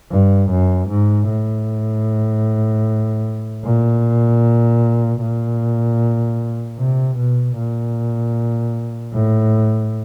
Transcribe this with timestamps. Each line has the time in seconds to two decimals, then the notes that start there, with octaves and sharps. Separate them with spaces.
0.11 G2
0.50 F#2
0.90 G#2
1.29 A2
3.64 A#2
5.21 A#2
6.78 C3
7.17 B2
7.57 A#2
9.14 A2